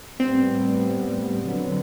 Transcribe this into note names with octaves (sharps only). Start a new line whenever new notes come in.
A2 G3 B3 C4
D3 F#3 B3